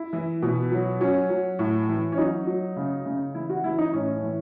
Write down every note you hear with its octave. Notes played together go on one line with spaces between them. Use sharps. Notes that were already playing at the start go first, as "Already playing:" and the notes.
Already playing: E4
E3
B2
F#3
F#3 C#4
F#3
A2
E3
C#4
F#3 D#4
F#3
C#3
C#3
E3 E4
F#4
E3 E4
D#4
A2 C#4
E3